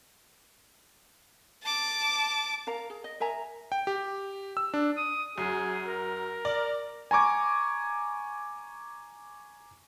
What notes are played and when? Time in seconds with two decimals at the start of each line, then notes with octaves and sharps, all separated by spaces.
1.63 A5 D6
2.67 A#4 F5 A#5
2.90 G#4
3.04 D#5
3.20 A#4 E5 G#5 A#5
3.72 G5
3.87 G4
4.57 E6
4.74 D4
4.97 D#6
5.38 F#2 G#4
5.87 A#4
6.45 D5
7.11 G#5 A#5 C#6 D6 G#6